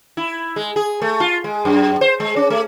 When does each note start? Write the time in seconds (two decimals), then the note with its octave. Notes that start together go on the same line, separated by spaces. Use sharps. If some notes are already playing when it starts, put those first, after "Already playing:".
0.17 E4
0.56 G#3
0.76 G#4
1.02 A3
1.20 F4
1.44 G#3
1.65 F#2
2.01 C5
2.20 G#3
2.36 C#4
2.50 A3